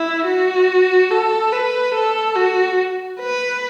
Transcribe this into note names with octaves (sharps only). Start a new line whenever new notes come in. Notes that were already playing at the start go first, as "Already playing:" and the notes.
Already playing: E4
F#4
A4
B4
A4
F#4
B4